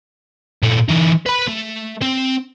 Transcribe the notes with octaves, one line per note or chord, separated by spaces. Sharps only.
A#2 A3
E3 D#4
B4 B5
A3
C4 C5